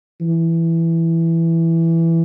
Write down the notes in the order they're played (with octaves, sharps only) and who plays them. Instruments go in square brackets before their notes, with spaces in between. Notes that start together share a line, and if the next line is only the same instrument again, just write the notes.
[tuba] E3